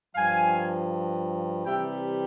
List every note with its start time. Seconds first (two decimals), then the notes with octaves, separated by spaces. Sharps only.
0.15 G2 F3 F5 G#5
1.65 C3 E3 G3 E5 G5